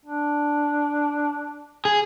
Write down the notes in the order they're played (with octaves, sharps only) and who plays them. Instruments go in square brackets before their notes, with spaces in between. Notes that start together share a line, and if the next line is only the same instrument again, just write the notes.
[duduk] D4
[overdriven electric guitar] G#4